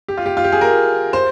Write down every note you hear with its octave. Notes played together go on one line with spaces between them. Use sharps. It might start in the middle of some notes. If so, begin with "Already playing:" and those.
G4
F4
G4
F4
G4
G#4
A#4
C5